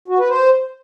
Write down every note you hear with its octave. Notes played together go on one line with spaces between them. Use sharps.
F#4
B4
C5